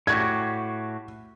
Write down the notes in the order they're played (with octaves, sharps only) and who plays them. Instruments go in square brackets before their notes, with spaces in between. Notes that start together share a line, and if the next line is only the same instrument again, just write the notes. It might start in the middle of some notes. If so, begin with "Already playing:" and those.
[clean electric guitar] A2 F#4 G4 [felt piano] G#6